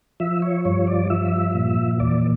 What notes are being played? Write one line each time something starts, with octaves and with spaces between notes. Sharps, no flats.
F3 E5
C#5
G2 C#5
D5
F3 E5
A#2
E2 D5